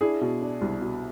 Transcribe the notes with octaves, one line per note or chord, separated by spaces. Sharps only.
D4 E4 G#4
B2
D4
C2
B2